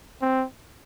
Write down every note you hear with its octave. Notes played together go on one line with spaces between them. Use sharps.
C4